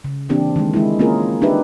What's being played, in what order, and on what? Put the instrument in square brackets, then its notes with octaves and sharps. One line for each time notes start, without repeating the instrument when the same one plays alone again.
[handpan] C#3
E3 A#3 C4 D4 G4
D#3 G#3
G#3 E4
A#3 C4 C#4 F4 G#4 A#4
D4 D#4 G4 B4 E5